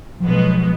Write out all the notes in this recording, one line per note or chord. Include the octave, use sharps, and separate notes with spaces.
B1 B2 F3 G#3 B3